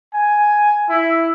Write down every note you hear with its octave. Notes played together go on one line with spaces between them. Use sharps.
G#5
E4